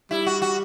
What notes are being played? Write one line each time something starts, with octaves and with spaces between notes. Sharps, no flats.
G3 E4
F#4
F#4